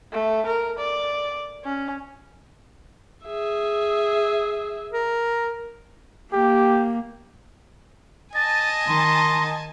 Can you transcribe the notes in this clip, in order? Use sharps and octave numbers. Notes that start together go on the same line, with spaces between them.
A3
A#4
D5
C#4
G#4 E5
A#4
A#3 G4
D#5 G#5 A5 A6
D#3 C6